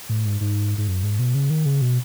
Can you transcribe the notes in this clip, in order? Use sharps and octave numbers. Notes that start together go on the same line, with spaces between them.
A2
G#2
G#2
G#2
F#2
G#2
B2
C#3
D#3
C#3
B2